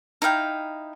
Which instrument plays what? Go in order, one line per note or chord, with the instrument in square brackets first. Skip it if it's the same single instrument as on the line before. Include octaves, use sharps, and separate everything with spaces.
[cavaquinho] D#4 E4 F5 G5